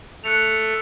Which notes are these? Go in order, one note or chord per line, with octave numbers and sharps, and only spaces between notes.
A3 F#6 C#7 F7